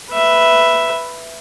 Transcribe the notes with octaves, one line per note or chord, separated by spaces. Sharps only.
B4 E5